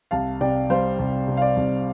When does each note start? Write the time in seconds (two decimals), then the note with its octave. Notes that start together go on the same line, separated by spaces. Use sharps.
0.11 C2 F5 A5
0.41 C3 D5 G5
0.70 G3 C5 F5
0.99 C2
1.28 C3
1.37 F5
1.42 D5
1.56 C2